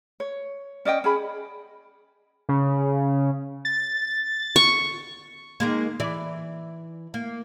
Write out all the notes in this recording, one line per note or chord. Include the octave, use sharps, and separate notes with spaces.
C#5
C#4 D5 D#5 G5
C#4 G#4 B5
C#3
A6
C#6
D#3 G#3 A#3
E3 D5
A#3